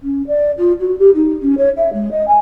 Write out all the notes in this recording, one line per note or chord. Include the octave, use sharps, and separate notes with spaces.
C#4
D5
F4
F#4
G4
D#4
C#4
C#5
E5
G#3
D#5
G#5